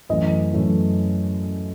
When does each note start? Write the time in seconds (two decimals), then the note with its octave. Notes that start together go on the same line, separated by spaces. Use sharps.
0.09 F#2 E3 A3 D#5
0.53 F#2 E3 A3